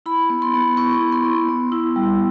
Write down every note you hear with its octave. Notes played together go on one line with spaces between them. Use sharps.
E4 B5
B3
C6
B3
E4 C#6
E4
C6
B3
B3
E4
G3